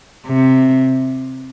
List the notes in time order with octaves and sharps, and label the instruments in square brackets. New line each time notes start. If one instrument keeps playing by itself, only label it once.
[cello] C3